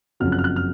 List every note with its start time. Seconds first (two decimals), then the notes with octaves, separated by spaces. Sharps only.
0.20 F#1 F2 C#3 F#3 F6
0.32 F#6
0.39 F6
0.44 F#6
0.56 F6